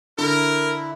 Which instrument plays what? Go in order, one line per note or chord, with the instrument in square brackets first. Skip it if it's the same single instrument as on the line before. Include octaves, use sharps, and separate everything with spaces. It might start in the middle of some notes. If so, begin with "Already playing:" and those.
[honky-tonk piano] D3 [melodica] E4 [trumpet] A#4